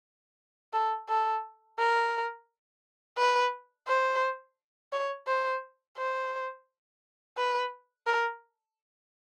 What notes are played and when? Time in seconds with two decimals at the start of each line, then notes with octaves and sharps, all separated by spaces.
0.73 A4
1.09 A4
1.79 A#4
3.18 B4
3.88 C5
4.93 C#5
5.27 C5
5.98 C5
7.37 B4
8.07 A#4